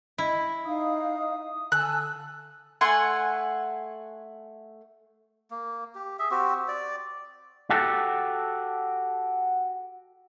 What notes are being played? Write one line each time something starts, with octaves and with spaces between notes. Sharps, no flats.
E4 D#5
D#4 F5 D#6
D3 G#5 A5 E6 F#6
A3 F#5 G#5 C6
A#3
G4
G#4 E5
C4 F#4 G4
D5
F#4 G4 A4